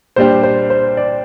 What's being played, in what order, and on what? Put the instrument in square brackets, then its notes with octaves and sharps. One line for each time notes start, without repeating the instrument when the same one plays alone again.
[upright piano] A#2 G3 D4 G4 [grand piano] C5
[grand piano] C5
C5
D5